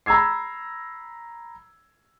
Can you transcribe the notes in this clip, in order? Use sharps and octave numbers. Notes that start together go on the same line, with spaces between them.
A#5 B5 E6 G#6 C7